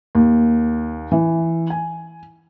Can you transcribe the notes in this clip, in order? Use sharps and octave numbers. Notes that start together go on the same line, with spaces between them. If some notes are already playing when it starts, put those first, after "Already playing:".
D#2
E3
G#5